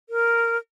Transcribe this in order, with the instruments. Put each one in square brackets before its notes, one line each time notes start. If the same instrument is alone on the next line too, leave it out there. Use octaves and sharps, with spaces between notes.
[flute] A#4